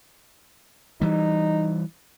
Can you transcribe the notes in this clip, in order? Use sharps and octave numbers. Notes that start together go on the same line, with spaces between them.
E3 G3 D#4